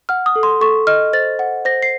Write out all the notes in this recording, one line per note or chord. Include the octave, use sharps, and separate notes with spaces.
F#5 F6
D#6
A4
C6
A4 C#6
D#5 F6
C5 A6
F#5
C5 A#6
C7